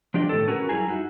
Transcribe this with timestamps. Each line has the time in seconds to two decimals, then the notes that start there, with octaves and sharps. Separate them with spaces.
0.14 F3 D4 G4 D5 D#5
0.29 A2 D#3 E3 C4 A4
0.48 C#4 F#4 G#4 A#4 B4
0.69 F#2 G3 E4 G#4 G#5 A#5
0.87 D#4 E4 F#4